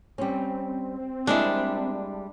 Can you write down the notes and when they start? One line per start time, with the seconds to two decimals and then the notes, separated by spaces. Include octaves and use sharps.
0.18 G3 C4 C#4
1.27 G3 G#3 A#3 D4 E4